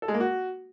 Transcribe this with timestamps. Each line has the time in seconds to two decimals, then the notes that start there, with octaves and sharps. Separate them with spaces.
0.02 A4
0.08 G#3
0.14 A#3
0.20 F#4